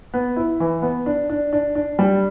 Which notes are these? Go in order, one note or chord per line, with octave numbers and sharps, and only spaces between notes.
B3
E4
E3
B3
D4
D4
D4
D4
G3